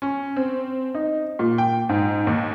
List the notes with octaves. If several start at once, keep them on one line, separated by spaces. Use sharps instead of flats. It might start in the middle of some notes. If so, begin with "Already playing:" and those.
C#4
C4
D#4
A#2
G5
G#2
D#2